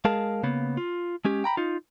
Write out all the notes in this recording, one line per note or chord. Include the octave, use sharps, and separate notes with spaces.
G#3 G#4 A#4 F5 A5
C#3 A#3 B3
F4
G#3 C#4 G4
G5 A#5 B5
D#4 F4